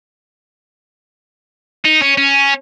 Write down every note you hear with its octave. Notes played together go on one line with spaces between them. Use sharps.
D#4
C#4
C#4